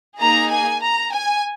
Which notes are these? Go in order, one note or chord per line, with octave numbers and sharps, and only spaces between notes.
A#3 D#4 G#4 A#5
G#5
A#5
G#5